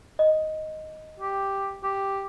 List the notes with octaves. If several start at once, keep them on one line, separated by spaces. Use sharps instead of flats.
D#5
G4
G4